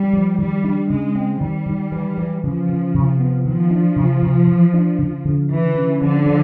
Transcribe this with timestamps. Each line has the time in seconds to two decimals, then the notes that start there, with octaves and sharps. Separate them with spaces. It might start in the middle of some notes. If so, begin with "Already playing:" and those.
Already playing: G3
0.13 F3
0.38 D#3 G3
0.64 D4
0.90 C#3 G#3
1.15 C4
1.41 D#3 G3
1.66 D#3
1.92 E3
2.18 E3
2.43 C#3 F3
2.69 C#3
2.94 C3
3.20 B3
3.45 D#3 F3
3.71 D4
3.96 C3
4.22 C3
4.47 E3
4.74 D4
4.98 C#3
5.25 C#3
5.50 D3 E3
5.75 C#4
6.01 D3 F3
6.26 F3